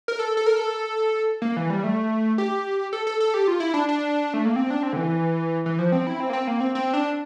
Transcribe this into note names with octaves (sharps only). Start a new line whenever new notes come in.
A#4
A4
A4
A#4
A4
A#3
E3
G3
A3
G4
A4
A4
A4
G4
F4
E4
D4
D4
A3
A#3
C4
D4
C4
D3
E3
E3
F3
C4
E4
C4
A#3
C4
A#3
C4
C4
D4